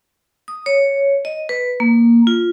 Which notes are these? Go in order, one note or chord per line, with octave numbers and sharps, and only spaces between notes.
D#6
C#5
D#5
B4
A#3
F4